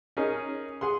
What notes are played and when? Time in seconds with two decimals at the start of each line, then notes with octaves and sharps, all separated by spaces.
0.17 C#4 D#4 G#4 A#4
0.81 G#4 F#5 C6